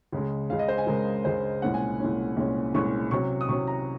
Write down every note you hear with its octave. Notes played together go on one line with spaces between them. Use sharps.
C#2 C#3 G#3
C#2 C#3 G#3 F5
D#5
C5
G#5
C#2 C#3 G#3 A#4
C#2 C#3 G#3 C5
C2 A#2 G#3 C#4 F#5
G#5
C2 A#2 G#3 C#4
C2 A#2 G#3 C#4
C2 A#2 G#3 C#4 C#6
C3 F#3 C#4 C#6
D#6
C3 F#3 C#4 C#6
A#5